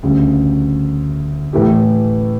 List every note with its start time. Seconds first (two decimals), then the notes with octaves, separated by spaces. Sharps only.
0.03 D2 C#3 G3
1.53 A2 E3 A3 E4 G4